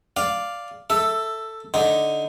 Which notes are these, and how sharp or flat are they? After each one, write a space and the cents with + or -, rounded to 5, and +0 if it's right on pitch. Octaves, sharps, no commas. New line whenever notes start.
D5 +0 F5 +0
A4 +10 E5 +0
D3 +0 D#4 +5